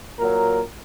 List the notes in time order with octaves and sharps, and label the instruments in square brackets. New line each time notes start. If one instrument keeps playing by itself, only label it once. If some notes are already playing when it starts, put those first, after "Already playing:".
[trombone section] A#2 F#3 A#4